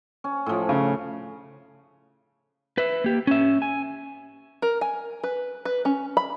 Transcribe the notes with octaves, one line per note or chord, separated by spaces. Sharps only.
C#4
A2 F3
C#3
B4 E5
A#3 G4
C#4 E5
G#5
A#4
G#5
B4
B4
C#4
B5